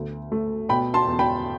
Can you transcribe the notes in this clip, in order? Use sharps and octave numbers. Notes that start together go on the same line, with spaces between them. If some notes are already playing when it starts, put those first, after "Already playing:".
Already playing: D2 B3
A3
B2 G5 B5
A5 C6
E2
G5 B5